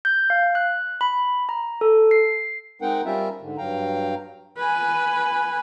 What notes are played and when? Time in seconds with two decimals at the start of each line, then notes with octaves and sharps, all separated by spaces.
0.05 G6
0.30 F5
0.55 F#6
1.01 B5
1.49 A#5
1.81 A4
2.11 C7
2.82 G#3 C4 D#4 A#4 F#5 G5
3.05 G3 C4 C#4 F4 A#4 E5
3.41 G#2 D3
3.58 G2 F#3 F5 G5 A#5
4.58 B4 G#5